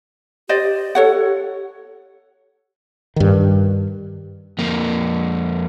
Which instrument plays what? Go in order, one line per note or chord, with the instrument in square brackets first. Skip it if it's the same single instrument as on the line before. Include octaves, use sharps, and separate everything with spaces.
[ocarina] G4 [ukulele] C5 D5 D#5
[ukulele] A4 C#5 F#5
[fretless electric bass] G2 D#3
[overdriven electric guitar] F2 A#3